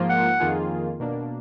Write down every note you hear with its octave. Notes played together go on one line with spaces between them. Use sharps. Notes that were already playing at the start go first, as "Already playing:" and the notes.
Already playing: G#2 F3 A#3 F4
F#5
F2 D#3 A#3 F4 G#4
B2 A#3 D4